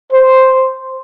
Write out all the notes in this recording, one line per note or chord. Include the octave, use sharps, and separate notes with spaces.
C5